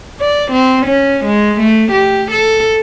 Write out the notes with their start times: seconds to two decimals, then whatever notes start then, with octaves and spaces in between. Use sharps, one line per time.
0.21 D5
0.51 C4
0.86 C#4
1.25 G#3
1.60 A3
1.92 G4
2.31 A4